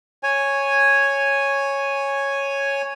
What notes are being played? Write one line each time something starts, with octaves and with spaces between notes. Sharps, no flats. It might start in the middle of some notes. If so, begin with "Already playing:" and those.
C#5 G#5